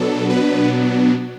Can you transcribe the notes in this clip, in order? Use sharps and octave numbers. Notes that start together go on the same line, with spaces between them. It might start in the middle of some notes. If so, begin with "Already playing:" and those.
Already playing: B2 F#3 B3 D4 A4
B4